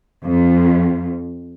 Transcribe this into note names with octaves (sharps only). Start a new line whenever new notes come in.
F2